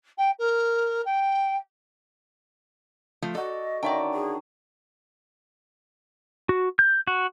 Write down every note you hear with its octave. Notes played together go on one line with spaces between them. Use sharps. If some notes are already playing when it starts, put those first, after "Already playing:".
G5
A#4
G5
F3 A3 F4
F#4 A4 D5 D#5
D3 D#3 C#4 D5 E5 G5
G#4
F#4
G6
F#4